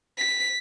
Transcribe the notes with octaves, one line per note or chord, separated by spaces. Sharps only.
B6